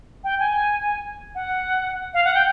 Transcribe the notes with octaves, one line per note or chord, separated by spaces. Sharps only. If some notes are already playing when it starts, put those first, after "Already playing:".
G5
G#5
F#5
F5
F#5
G5